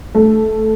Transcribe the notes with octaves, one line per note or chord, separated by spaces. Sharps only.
A3